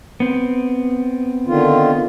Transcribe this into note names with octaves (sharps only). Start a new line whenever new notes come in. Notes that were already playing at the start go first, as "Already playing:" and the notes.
B3 C4
D3 D#3 F4